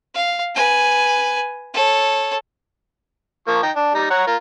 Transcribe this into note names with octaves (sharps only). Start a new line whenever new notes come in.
F5
B4 G#5
A4 C#5
F3 A#3 C#6
D#4 G5
D4
G3 D#4
C#5 F#5 A#5
F4 A#4